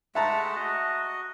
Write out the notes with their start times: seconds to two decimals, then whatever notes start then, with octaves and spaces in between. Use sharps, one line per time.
0.15 G#3 A3 E5 F#5 A5 A#5
0.56 F#4 D#5